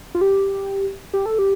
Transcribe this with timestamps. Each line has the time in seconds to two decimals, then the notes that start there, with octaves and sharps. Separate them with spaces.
0.15 F4
0.21 G4
1.14 G4
1.26 A4
1.39 G4